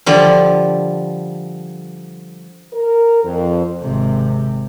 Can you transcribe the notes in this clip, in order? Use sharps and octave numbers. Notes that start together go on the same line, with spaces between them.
D3 F3 G3
A#4
F2
G#1 C3